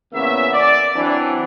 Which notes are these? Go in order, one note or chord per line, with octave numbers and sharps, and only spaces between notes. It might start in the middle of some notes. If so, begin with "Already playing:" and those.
E2 C#3 A#3 B3 C#4 E5
D5
E3 F#3 C4 D4